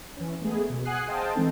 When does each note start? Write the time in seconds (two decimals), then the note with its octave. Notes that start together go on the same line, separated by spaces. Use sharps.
0.17 E3 C#4
0.41 G#3 A3 B3 G#4
0.70 B2
0.85 F#5 G#5 D#6 F#6 C7
1.07 G#4 C5 D#5 F5 G5 A5
1.35 E3 G#3 C4 D#4 A4